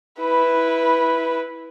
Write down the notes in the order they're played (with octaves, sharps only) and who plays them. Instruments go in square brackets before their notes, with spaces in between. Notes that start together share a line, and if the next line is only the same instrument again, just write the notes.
[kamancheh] E4 B4